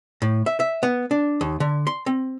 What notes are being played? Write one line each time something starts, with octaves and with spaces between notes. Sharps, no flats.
A2
E5
E5
B3
D4
D#2
D3
C6
C4